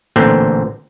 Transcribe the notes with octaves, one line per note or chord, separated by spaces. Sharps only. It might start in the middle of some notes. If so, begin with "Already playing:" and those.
A1 A#2 D3 C4